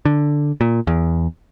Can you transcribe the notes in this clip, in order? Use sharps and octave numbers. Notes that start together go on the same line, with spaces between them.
D3
A#2
E2